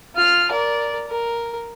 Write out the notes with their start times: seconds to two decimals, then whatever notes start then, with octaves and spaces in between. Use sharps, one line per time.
0.16 F4 F6
0.51 A#4 D5
1.08 A#4